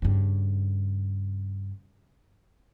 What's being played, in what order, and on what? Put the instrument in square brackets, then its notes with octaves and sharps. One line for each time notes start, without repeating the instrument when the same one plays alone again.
[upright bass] G2 C#3